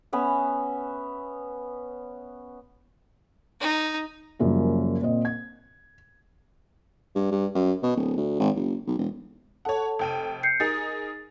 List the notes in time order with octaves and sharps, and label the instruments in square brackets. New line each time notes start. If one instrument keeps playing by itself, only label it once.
[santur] B3 C#4 E5
[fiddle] D#4
[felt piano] F#2 C#3 F3 G3 A#3
A#2 C4 D#5
G#6
[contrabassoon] G2
G2
F#2
B2
D1
D2
G#1
F#1
B1
E1
[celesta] A4 A5 [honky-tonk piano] C#5 F#5
[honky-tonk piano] F1 G5 D#7
[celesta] G6 C7 C#7
[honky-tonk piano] D#4 G#4 A#4 [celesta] A6